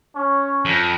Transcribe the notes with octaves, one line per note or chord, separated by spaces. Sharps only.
C#4 C#5
F2